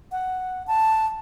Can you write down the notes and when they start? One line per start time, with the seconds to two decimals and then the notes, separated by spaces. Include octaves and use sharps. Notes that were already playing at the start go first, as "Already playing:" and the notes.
0.12 F#5
0.67 A5